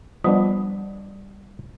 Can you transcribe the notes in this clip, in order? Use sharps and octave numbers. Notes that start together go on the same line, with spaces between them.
F3 G3 B3 D4